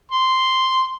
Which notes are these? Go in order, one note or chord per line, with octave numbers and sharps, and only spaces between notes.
C6